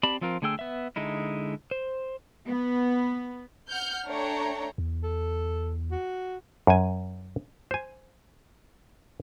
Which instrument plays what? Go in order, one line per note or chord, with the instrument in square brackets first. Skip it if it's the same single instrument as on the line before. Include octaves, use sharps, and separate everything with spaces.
[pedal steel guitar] C4 G4 D5 A5 B5
F3 C4 F4 A#4
D3 A3 G#4 G5 E6
B3 E5
D3 G#3 D#4 E4
C5
[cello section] B3
[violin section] F#5 F6 G6
A3 D4 C#5 G5 A#5
[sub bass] E2
[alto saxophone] A4
F#4
[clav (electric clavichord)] F#2 G#5
C5 G#5